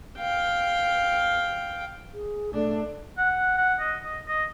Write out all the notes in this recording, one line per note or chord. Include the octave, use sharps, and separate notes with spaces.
F5 G5
G#4
A3 D4
F#5
F#5
D#5
D#5
D#5